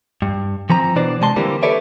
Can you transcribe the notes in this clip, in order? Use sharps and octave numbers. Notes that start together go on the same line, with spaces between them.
G2
E3 F3 C4 A#5
B2 E3 D4 C5 D5
C3 G#3 A5 C6
D3 E3 G3 A#3 C4
G4 A4 B4 C#5 D5 E5